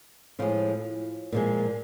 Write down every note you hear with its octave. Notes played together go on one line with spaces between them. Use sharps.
A2 F3 G#3 F4
A#2 F3 G#3